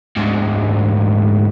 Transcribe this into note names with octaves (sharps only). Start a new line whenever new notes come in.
D2 G#2